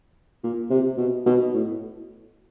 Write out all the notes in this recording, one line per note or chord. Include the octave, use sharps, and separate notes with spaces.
A#2
C3
B2
B2
A2